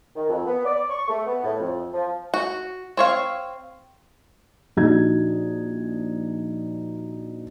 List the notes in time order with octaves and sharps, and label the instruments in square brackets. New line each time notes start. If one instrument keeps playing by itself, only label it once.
[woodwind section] D#3
F2
B3
D5
C#6
A3
B3
A2
F2
F3
[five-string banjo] F#4
C4 C#5 F5
[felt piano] A#1 D#4 F#4 G#6